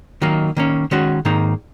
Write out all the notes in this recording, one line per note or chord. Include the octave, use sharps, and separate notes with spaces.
D#3 F#3 A#3 D#4
D#3 A#3 C#4
D#3 G#3 C#4 F#4
G#2 D#3 A#3 D#4